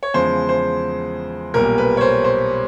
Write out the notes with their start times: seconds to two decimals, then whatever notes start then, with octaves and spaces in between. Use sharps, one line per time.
0.03 C#5
0.14 E2 C#3 F3 G#3 C5
0.49 C5
1.54 B1 A#2 G3 A#4
1.78 B4
1.97 C#5
2.01 C5
2.24 C5